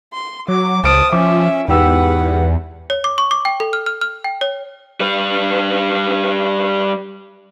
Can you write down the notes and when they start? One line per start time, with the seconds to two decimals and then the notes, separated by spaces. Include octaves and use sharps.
0.13 C6
0.48 F#3 D6
0.84 C#2 C5 A5 D#6 F6 D7
1.13 F3 C#4 E5 D6
1.68 E2 G#2 G4 B4 F#5 E6
2.90 C#5
3.04 D6
3.18 C#6
3.31 D6
3.45 G5
3.60 A4
3.73 F6
3.86 F6
4.01 F6
4.24 G5
4.41 C#5
5.00 G3 B4